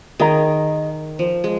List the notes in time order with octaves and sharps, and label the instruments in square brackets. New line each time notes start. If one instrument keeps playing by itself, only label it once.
[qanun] D#3 [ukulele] G#4 D#5 A#5
[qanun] F3
G#3